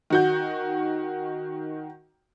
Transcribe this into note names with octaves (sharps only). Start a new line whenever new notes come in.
D#3 F#4 G6